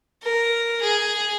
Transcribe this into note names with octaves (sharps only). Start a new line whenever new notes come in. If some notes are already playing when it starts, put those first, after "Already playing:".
A#4
G#4